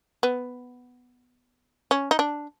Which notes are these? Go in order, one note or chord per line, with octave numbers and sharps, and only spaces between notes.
B3
C#4
D#4
D4